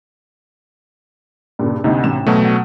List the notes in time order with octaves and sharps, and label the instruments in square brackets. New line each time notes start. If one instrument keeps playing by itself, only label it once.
[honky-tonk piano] G2 A#2 C#3
[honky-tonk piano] D2 D#4 [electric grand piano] C3
[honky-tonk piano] A1 E7
[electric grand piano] B2 F#3 A3
[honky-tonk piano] F#5